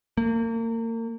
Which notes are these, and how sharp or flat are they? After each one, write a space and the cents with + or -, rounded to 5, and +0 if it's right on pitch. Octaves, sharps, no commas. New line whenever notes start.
A#3 -35